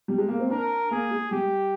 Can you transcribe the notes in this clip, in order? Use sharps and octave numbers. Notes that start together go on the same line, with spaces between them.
G3
G#3
A#3
C4
D4 A#4
A#3 G#4
G#3
G3 G4